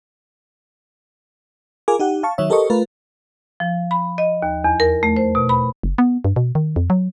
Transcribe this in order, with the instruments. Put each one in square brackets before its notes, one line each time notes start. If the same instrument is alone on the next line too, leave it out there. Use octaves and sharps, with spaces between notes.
[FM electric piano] F4 G#4 A#4 G#5 D6
D#4 G4 F#5
F5 A5 C#6
D#3 F#3 C#5 E5
G4 A4 A#4 C5 D#5 C#6
A3 F4 A#4 B4
[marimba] F3
B5
D#5
D#2
E2
A#4
A3
C5
B2
B5
[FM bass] F#1
B3
G2
B2
D#3
F2
F#3